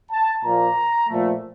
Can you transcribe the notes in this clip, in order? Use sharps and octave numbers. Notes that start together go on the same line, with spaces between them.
A5
A#2 F3 A#3 A#5
A#2 F3 A3